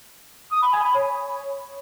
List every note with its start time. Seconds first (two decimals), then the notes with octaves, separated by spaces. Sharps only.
0.51 D#6
0.62 B5
0.73 G#5
0.84 B5
0.95 C#5